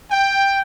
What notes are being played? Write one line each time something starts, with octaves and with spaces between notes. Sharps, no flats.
G5